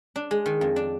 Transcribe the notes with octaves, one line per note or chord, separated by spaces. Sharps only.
D4
G#3
D#3
F2
D4